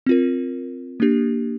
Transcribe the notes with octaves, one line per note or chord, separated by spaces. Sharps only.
C4 F4 A#4
A#3 D4 G4